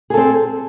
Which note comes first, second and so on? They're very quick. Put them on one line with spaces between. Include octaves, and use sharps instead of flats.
G#4 A4 C4